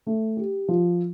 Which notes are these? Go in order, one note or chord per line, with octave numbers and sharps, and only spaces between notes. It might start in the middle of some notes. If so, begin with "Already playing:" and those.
A3
G4
F3